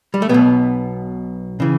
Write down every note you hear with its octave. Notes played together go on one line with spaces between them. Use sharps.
G3
A3
B1 B2 B3
C#3 E3